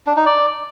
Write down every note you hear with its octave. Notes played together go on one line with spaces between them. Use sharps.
D4
D#4
D5